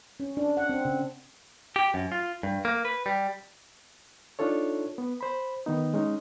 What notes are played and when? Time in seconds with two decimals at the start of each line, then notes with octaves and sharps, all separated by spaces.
0.20 C#4
0.37 D4
0.57 F#5
0.69 C4
0.85 C#3
1.76 G4
1.94 F#2
2.12 F4
2.43 G2
2.65 A#3
2.85 B4
3.06 G3
4.39 D4 D#4 F4 A4 C#5
4.98 B3
5.21 C5 B5
5.66 D#3 B3 D#4
5.94 G#3 C#4 D#4